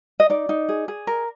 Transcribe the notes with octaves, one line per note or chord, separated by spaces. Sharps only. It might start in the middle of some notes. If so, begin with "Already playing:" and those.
D#5
D#4 D5
D#4
G#4
G#4
A#4